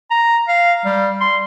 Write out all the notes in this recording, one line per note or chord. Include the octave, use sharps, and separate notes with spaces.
A#5
F5
G3
C6